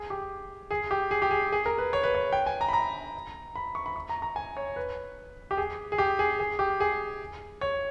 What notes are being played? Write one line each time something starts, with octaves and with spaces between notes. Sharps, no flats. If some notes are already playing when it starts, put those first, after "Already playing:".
Already playing: G#4
G4
G#4
G4
G#4
G4
G#4
G#4
A#4
B4
C#5
B4
C#5
G5
G#5
A#5
B5
A#5
B5
C#6
B5
C#6
A#5
A#5
G#5
C#5
B4
G4
G#4
G#4
G4
G#4
G#4
G4
G#4
C#5